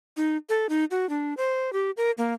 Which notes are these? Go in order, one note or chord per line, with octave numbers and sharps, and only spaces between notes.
D#4
A4
D#4
F#4
D4
C5
G4
A#4
A#3